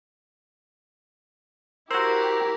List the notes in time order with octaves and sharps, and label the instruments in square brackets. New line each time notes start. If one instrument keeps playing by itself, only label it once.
[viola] E4 G4 [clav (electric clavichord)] F#4 C5 [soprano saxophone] A#4 [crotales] E6 G#6